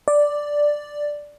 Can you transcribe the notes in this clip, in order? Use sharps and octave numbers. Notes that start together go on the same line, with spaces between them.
D5